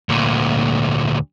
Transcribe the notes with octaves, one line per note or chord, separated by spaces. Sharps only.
D2 A#2